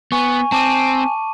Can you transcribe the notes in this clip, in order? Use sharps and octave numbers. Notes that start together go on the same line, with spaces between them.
B3 G#5 C#6
C4 A5 D6 D#7